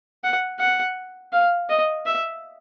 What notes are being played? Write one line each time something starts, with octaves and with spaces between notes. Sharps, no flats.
F#5
F#5
F5
D#5
E5